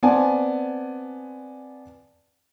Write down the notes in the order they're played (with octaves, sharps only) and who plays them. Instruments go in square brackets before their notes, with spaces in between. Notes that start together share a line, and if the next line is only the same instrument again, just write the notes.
[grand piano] B3 C4 D5 G#5 A5